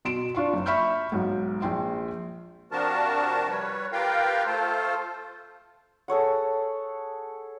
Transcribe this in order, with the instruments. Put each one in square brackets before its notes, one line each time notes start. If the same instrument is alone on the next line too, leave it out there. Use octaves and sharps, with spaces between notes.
[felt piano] B2 C6 D7 E7
D4 F4 C6 C#6
F#1
E5 B5 C#6 F6 G6
B1 G#2
A#1 G5 C6
[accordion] C3 F3 D4 F#4 A#4 A5
G3 B4 C#5
F4 G4 A#4 B4 F5 G5
A3 F4 A4 C5
[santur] G#4 A4 C#5 F#5